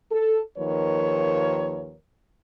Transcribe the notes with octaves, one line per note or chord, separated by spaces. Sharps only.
A4
D#2 D#3 F3 A#4 B4 C#5